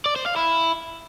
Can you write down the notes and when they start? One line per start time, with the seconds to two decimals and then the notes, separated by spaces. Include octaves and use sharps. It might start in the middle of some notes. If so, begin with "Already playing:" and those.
0.06 D5
0.16 C5
0.26 F5
0.36 E4